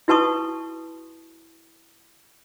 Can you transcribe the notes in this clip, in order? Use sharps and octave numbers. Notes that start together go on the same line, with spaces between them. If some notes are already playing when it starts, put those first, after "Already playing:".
E4 F#4 B4 A5 C#6 D#6